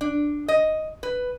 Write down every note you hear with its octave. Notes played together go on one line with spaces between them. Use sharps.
D4
D#5
B4